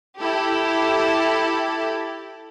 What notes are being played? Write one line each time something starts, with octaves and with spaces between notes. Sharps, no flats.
E4 G4 A4